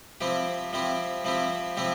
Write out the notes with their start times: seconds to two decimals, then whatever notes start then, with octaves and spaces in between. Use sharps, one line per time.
0.21 F3 C4 E4 G4
0.73 F3 C4 E4 G4
1.25 F3 C4 E4 G4
1.77 F3 C4 E4 G4